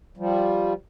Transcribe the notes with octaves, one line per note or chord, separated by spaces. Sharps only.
F3 G3